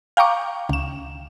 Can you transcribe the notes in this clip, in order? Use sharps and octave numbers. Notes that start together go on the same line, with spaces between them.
F5 G5 A#5 C#6 D6
C#2 E7